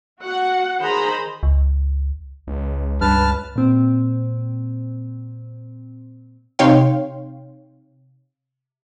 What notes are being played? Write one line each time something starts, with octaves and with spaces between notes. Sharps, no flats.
F#4 F#5
D#3 G#4 C5 A#5 B5
C#2
C#2
G2 B4 A5 F6
A#2 C4
C3 D#4 C#5 F5 G5 C6